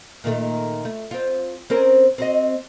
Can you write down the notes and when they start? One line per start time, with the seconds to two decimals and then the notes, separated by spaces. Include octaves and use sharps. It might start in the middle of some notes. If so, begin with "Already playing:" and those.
0.24 A#2 D#3 A3
0.85 A3
1.11 C4 F4
1.70 C4 C#4 A#4
2.18 C4 F#4 D#5